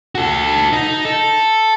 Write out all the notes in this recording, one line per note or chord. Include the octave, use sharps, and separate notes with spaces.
F#4 A4
D#4
A4